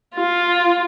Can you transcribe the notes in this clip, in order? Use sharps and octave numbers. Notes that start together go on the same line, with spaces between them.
F4